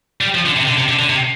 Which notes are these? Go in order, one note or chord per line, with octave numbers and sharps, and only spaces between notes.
G3
F3
D3
C3
D3
C3
D3
D3
C3